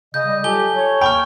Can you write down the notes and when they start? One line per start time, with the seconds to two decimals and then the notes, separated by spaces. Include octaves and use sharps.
0.14 C#3 D#5 G6
0.26 G3
0.44 F#3 F4 G4 A4 G#5 G7
0.75 C#5
1.01 D#2 G5 B5 C#6 F6